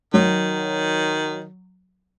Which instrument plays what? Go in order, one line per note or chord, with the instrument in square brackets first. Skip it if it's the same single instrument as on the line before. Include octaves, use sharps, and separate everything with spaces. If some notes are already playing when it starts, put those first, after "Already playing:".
[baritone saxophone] D#3 [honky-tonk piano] F#3